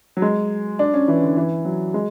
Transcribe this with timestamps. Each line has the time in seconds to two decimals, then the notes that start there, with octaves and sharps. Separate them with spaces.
0.17 F#3
0.22 G#3
0.79 D4
0.94 C#4
1.08 E3
1.22 D3
1.37 E3
1.65 F#3
1.94 G#3